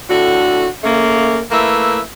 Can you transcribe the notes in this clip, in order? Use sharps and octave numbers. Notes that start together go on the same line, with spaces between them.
A2 D3 F#4
C#3 A3 A#3
A3 A#3 E4 B4 E5